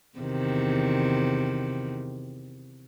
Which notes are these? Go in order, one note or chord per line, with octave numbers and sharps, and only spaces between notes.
E2 C3 D#3